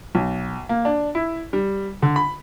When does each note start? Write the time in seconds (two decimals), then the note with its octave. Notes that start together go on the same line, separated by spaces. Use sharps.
0.15 B1
0.69 A#3
0.85 D4
1.15 E4
1.53 G3
2.02 D3
2.16 B5